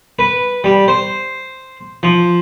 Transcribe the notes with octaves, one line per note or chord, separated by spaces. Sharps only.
B4
G3
C5
F3